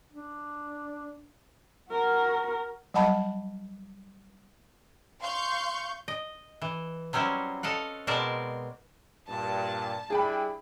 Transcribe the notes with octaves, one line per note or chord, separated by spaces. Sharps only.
D4
F#4 A#4
F#3 G3 D#5 F#5 A5 B5
F5 C6 C#6 G6
D#5
E3
F#3 G3 C4 C#4 E4
A4 D#5 F5 F#5
B2 G#3 C4 A#4 D5 A5
G2 A#2 A5
G3 D4 E4 G#4 G5 B5